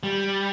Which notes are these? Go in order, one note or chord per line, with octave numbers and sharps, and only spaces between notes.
G3